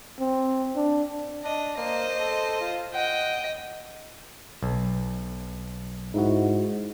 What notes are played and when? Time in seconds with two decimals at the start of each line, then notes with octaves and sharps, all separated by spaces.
0.20 C4
0.76 D4
1.44 D4 D#5
1.77 A#3 C5 D#5
2.20 A4
2.60 F4
2.94 D#5 F#5 G5
4.63 B1
6.14 G#2 D#4 E4 F#4